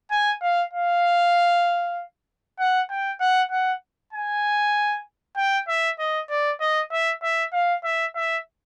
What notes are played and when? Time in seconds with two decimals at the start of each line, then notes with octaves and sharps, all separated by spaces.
0.11 G#5
0.42 F5
0.73 F5
2.59 F#5
2.90 G5
3.20 F#5
3.51 F#5
4.13 G#5
5.37 G5
5.68 E5
5.99 D#5
6.30 D5
6.60 D#5
6.92 E5
7.23 E5
7.53 F5
7.84 E5
8.16 E5